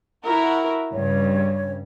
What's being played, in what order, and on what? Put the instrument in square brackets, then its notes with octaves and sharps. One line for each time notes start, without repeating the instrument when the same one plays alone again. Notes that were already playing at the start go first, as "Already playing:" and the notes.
[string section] E4 F#4 A#4
[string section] G2 C#3 [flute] C#5